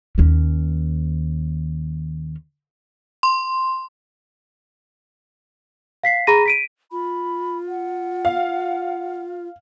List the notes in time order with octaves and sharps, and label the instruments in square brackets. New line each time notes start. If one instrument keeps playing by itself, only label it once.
[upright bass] D#2 C#4
[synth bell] C6
[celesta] F5 B6 C7
G#4 A#5 B5 A#6 D#7
B6 D7 D#7
[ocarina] F4 [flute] B5
[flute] F#5
[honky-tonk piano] F5